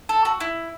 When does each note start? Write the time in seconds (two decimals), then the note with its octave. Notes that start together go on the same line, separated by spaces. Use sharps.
0.09 A4
0.25 F#4
0.40 E4